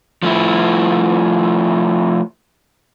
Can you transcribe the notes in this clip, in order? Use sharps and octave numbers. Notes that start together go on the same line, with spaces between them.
F3 A3 E4